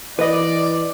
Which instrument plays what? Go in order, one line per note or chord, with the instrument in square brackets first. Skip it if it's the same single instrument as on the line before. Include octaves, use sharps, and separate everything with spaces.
[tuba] E3 [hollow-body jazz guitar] B4 D#5 [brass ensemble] D5